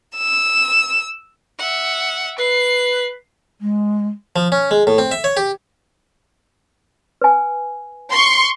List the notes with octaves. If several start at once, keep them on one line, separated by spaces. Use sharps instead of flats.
E6
E5 F#5
B4 C7
G#3
F3
C#4
G#3
A2
C4
E5
C#5
G4
B4 G#5
C6 C#6